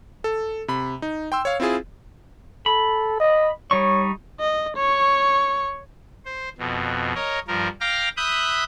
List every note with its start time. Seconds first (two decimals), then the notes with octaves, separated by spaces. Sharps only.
0.24 A4
0.68 C3 B5
1.02 D#4
1.32 G5 C6 E6
1.45 C#5 F5
1.60 C4 E4 F4 G#4
2.66 A4 B5
3.20 D#5
3.71 G3 D#4 C#5 C#6
4.40 D#5
4.77 C#5 C#6
6.25 C5
6.58 F2 B2
7.15 A#4 C#5 D#5
7.48 G2 F3 A#4
7.81 F5 G5 A#5 D6 F6
8.17 E5 B5 D#6 F#6 G6